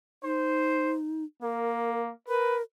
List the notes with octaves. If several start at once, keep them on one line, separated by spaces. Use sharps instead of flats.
D#4 C5
A#3 A#4
A#4 B4